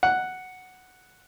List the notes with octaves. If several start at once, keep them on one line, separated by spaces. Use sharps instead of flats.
F#5